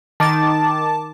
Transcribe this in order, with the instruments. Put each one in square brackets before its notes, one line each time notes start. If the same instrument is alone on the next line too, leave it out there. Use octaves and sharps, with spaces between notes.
[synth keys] D#3 A6 [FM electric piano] A5 D6